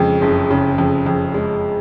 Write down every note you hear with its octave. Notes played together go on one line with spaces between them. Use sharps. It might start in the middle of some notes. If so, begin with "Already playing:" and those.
Already playing: F2 C#3 G#3
F#1
C#3
F2
F2
G#3